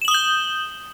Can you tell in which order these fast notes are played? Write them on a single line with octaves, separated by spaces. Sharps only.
E7 F#7 D#6 G7 G6